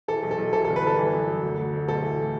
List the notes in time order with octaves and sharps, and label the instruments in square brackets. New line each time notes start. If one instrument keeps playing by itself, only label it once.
[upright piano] E3 A4
B1
A4
B1
E3 A4
A4
G1
B4
G1 A4
E3
F#2
F#2
D2
D2
D2
B1 A4
E3
A2